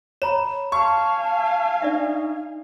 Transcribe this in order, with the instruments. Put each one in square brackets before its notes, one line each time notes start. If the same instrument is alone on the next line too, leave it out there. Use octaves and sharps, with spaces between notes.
[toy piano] C#5 A#5 B5 [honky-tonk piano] E7
[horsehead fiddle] F5 G#5 [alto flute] A5 [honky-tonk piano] C#6
[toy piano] D4 D5 E5 [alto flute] D#4